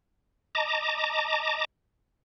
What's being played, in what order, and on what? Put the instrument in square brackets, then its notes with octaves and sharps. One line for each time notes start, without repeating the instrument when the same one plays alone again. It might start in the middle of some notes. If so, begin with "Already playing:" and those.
[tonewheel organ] D#5 A5 A#5 D6